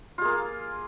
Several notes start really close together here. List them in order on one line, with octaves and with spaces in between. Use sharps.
F4 G#4 A#3